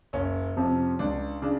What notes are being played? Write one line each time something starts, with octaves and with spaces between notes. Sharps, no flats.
F#1 C#4
F2 C3 F3
C#2 D4
C#3 D4